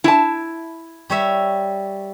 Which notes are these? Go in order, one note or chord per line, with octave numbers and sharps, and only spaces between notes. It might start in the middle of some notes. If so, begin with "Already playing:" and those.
E4 A5
G3 C#5 E5